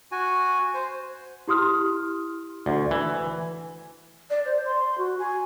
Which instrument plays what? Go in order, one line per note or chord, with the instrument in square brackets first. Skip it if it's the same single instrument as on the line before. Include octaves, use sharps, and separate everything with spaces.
[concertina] F#4 G#5
C5
[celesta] E4 G4 C6 D#6 F6
[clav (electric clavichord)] D2
E3
[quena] D5
C5
C6
F#4
G#5